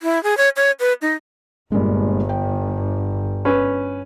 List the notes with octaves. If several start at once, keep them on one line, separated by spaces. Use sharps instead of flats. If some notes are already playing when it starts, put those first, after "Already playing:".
E4
G#4
C#5
C#5
B4
D#4
G1 G2 A#2 G#3
G5
C#4 B4